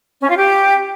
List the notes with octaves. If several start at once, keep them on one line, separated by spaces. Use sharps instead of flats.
C#4
F4
G4